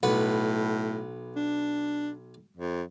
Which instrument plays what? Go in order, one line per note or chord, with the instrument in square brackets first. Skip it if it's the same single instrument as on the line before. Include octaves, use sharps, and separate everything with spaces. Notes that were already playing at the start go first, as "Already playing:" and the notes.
[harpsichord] B1 B4 F#5 [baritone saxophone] A2
[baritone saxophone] D4
F2